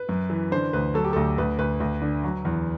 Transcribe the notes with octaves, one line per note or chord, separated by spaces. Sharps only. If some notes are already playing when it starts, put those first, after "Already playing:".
Already playing: B4
F#2
E3
D3 C5
D2 B4
F#3 A4
G4
D2 A4
D2 B4
D2 B4
D2
D3
F#3
E2